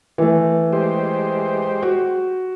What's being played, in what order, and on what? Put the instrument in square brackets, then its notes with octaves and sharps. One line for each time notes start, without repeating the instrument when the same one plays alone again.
[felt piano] E3 A3
[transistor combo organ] G#3 G4 C5
[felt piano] F#4